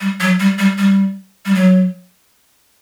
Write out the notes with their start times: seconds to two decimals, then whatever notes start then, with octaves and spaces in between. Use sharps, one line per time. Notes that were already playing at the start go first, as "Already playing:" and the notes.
0.01 G3
0.20 F#3
0.40 G3
0.59 G3
0.78 G3
1.45 G3
1.55 F#3